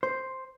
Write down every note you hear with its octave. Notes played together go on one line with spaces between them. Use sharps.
C5